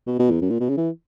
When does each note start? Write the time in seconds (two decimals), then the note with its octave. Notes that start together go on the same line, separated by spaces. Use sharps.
0.07 B2
0.19 B2
0.30 E2
0.42 F#2
0.50 A#2
0.60 B2
0.69 C#3
0.77 E3